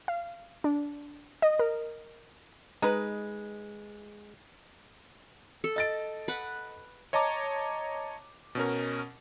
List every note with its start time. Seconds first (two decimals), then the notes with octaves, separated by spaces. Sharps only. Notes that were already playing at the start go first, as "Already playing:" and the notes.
0.08 F5
0.64 D4
1.42 D#5
1.59 A#4
2.82 G#3 D#4 B4
5.64 A4
5.76 D#5 A6 D7
6.28 B4 F#5
7.13 C#5 D#5 A5 A#5 D6
8.55 B2 C#4 A#4